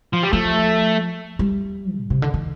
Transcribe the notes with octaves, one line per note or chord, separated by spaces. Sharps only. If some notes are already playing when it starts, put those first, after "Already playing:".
F3
G3
F3 A3
G3
A#2
C3
D3
D#3